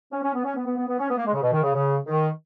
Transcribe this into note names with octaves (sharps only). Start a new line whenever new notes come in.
C#4
C#4
B3
C#4
B3
B3
B3
B3
C#4
B3
A#3
G#3
C#3
B2
D#3
C#3
C#3
D#3